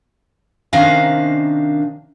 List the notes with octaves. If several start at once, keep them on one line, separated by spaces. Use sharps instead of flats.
C3 D#3 C#4 D4 F5 A#5